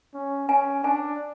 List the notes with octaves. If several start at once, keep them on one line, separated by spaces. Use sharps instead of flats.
C#4
C#4 G#5
D4 G#5